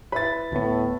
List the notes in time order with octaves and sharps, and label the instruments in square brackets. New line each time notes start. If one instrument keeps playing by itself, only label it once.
[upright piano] E4 B4 [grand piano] B5 A6
[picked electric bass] D2 B3 [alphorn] A2